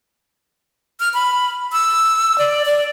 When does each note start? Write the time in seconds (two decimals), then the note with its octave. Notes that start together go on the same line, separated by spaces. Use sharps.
1.00 F6
1.14 B5
1.73 E6
2.38 D5
2.65 D5